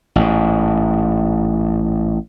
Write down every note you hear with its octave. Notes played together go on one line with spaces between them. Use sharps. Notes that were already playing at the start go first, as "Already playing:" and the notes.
A1 G#2